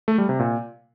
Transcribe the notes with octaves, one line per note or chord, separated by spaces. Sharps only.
A3
G3
C3
A#2